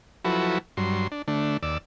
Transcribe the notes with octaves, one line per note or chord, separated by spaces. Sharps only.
F3 F#3 E4 F#4 A4 B4
G2 F#3 C6
D4
D3 A3 D4
D#2 D5 E6